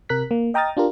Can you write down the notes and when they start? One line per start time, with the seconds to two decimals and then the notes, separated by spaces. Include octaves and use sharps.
0.09 C3 A#4 F#6 B6
0.31 A#3
0.54 D#5 G5 A#5 D#6 F6 A6
0.77 D4 F4 G4 A#4